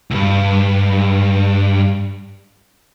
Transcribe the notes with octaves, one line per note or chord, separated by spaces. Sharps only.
C#2 G2